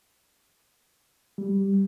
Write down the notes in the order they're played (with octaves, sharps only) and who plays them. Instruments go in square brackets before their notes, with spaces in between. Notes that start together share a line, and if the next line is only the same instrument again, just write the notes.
[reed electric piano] G3